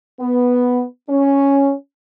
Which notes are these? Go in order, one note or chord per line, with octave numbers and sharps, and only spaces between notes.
B3
C#4